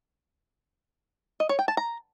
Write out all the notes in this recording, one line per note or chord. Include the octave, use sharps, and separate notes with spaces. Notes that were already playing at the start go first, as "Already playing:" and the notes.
D#5
C#5
G5
A5
A#5